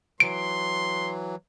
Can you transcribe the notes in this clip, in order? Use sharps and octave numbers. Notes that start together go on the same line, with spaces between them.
E3 F#3 C6 D7